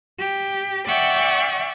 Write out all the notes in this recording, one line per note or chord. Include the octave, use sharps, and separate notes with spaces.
G4
D5 E5 F#5 G5 C#6 D6